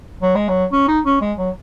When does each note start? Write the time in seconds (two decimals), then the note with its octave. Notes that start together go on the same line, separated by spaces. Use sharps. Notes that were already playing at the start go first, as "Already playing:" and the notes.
0.22 F#3
0.35 G#3
0.49 F#3
0.72 C#4
0.88 D#4
1.05 C#4
1.22 G#3
1.38 F#3